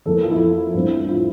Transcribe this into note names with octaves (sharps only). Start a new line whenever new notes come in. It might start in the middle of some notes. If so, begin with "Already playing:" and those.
F2 E3 A#3 A4
F4
E4
A1 G2 F3 C4
F4